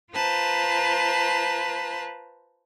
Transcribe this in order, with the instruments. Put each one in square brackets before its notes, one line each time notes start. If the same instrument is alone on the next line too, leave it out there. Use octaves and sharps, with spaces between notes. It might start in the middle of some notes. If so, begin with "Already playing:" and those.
[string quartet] F4 B4 C5 A5 A#5